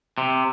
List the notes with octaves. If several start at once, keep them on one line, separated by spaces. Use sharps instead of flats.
C3